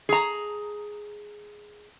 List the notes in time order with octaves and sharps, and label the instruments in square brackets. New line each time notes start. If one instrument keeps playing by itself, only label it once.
[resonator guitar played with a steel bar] G#4 A#5